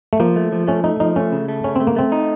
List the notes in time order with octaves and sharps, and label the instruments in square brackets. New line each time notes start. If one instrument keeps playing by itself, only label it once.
[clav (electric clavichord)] A3
[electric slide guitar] F3 [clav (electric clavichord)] A#3
[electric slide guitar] A3
F3
[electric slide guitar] A3 [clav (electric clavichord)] C#4
[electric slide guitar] A3 [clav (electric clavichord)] D#4
[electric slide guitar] F3 [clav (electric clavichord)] D#4
[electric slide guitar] A3 [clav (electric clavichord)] C#4
[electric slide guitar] C#3
A3
[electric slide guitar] C#3 [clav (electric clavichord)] C#4
[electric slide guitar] A3 [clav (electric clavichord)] C4
[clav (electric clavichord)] A#3
[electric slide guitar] A3 [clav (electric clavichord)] C4
[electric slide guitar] D#4